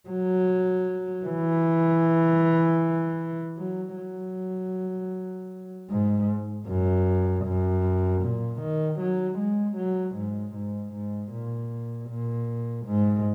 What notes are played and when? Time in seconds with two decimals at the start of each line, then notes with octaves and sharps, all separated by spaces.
0.09 F#3
1.26 E3
3.58 F#3
3.96 F#3
5.90 G#2
6.67 F#2
7.45 F#2
8.22 A#2
8.61 D#3
9.00 F#3
9.38 G#3
9.77 F#3
10.16 G#2
10.55 G#2
10.94 G#2
11.32 A#2
12.09 A#2
12.87 G#2